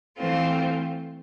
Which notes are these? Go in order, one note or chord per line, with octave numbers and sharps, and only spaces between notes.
E3 A3 C4 F4